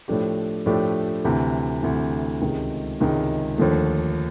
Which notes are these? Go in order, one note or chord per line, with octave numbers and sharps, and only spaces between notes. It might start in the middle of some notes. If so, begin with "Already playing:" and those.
A2 F3 A3 D4 G4
A2 F3 A3 D4 G4
D2 C3 E3
D2 C3 E3
C#2 C3 D#3 G#3
C#2 C3 D#3 G#3
D#2 D3 F3 A3